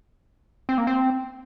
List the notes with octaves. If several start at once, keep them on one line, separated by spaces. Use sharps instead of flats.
C4
A#3
C4